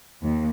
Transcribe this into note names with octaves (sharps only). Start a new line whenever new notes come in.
D#2